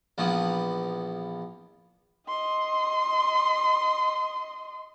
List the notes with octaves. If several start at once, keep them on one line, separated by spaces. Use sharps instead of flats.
A#1 E3 F3 B3
D#5 C6